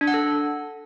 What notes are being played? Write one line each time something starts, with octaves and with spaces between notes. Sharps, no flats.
D4
F#5
A4